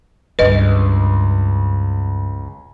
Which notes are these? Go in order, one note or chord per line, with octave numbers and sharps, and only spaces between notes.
C#2 G2 D4 B4 D#5